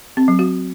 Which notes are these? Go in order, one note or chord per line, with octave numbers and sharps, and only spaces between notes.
C4
F#3
F#4